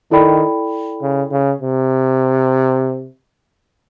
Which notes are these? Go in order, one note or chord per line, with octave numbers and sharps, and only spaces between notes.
D#3 E4 A4 D5 G5 B5
C#3
C#3
C3